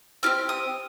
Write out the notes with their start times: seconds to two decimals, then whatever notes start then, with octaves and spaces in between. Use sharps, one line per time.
0.23 C4 E4 G4 F6
0.49 D#6